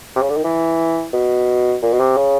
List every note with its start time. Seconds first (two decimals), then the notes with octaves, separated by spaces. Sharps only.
0.15 C3
0.22 C#3
0.29 D3
0.37 D#3
0.44 E3
1.13 B2
1.82 A#2
1.93 B2
2.00 C3
2.17 C#3